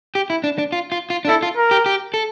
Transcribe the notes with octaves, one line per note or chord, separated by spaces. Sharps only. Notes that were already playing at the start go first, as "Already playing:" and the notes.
G4
E4
D4
D4
F4
F4
F4
D4
E4 A4
F4
A#4
G4
G4
A4